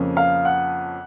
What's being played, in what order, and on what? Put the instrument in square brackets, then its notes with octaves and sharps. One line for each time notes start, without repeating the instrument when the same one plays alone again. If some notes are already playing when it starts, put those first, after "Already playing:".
Already playing: [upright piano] F2 C#3 F3 A#3 C#4
F5
F#5